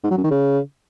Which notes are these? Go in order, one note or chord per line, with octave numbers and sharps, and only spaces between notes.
G#2
F#3
F#2
D#3
C#3